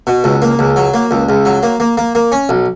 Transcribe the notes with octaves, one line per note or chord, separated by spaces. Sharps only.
B2
C#2
A#3
C#2
F#3
A#3
C#2
C#2
F#3
A#3
A#3
A#3
A#3
C#4
B1